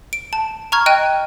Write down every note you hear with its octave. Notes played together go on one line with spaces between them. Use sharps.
D7
A5
A#5 C#6 F6 G#6
D#5 G5 F#6 D#7